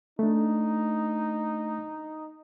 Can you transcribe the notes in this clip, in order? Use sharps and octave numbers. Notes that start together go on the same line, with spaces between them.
A3 D4 D#4